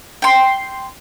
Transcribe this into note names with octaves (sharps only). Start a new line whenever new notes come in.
G5 C6